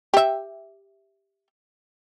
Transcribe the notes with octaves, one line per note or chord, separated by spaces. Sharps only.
G4 E5